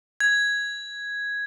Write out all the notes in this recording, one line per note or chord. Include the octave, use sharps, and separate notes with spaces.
G#6